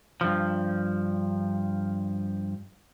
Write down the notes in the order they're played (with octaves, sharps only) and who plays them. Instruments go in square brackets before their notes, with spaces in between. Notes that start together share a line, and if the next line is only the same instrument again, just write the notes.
[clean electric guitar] G2 F3